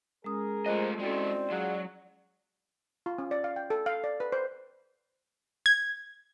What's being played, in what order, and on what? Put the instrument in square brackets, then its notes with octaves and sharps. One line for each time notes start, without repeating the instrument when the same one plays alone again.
[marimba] G#3 C#4 D#6 [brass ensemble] G#4 A#4
[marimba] G#3 F4 F#6 [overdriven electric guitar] A3 D#5 [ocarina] C5
[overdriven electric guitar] G#3 A4 [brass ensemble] C4 [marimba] C#4 E4 F#4 [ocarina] D5
[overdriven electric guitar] F#3 [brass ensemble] F4 G#4 F#5
[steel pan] F4
C#4
D5
F5
G5
A4
F5
D5
B4
C5
[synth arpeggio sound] G#6